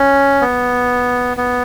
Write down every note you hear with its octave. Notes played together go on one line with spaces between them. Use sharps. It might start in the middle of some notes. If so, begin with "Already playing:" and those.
Already playing: C#4
B3
B3